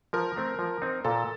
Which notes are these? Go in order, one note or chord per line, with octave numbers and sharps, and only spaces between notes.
F3 A#4
A3 C4
F3
C4 D#4
A#2 A4